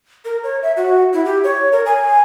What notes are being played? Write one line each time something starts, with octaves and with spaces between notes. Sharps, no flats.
A#4
C#5
E5
F#4
E4
G4
C#5
A#4
G#5